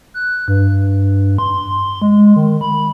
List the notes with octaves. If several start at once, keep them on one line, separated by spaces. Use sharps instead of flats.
F#6
G2
C6
G#3
D#3
B5